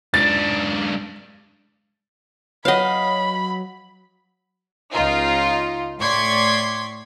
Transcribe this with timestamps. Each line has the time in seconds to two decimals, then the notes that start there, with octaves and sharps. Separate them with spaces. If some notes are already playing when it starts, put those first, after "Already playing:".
0.14 G#2 D4 A6
2.65 F#3 B4 C#5 D#5 F5 F#5 B5
4.91 C#2 D#4 F4
6.00 A2 D5 C6 C#6 G#6 B6